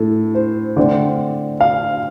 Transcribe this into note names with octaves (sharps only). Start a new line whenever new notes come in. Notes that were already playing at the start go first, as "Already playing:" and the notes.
Already playing: A2 A4
C5
D3 A3 C4 D5
F5